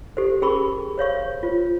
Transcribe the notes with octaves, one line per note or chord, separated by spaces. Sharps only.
G4 A4 C5
C#4 G#4 A#4 B5 C#6 D6
C5 C#5 F5 C#6
F4 C5